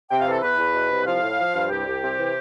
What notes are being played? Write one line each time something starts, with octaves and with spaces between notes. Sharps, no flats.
C3 G5
F5
E3
A4
E2 B4
E2
B2
C2
F3 F5
A2
F3
G2
C2 G4
C2
C3
E3